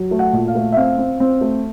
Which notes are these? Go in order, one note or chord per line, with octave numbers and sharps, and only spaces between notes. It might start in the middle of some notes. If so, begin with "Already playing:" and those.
Already playing: F#3
A3
F#5
A#2
F5
A3
E5
C4 F5
C4
C4
A3